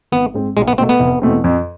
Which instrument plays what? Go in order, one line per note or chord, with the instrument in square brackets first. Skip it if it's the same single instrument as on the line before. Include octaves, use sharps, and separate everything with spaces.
[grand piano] G#1 [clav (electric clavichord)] B3
[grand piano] G#2 G#3 C4
[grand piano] B1 [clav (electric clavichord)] G#3
[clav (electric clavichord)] B3
[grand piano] B2 A3 [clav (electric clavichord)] C4
[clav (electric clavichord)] B3
[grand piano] F1
E2 B2 A3 C4
F2